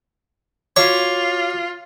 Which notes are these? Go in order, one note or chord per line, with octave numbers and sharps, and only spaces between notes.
F4 F#4 C#5 D6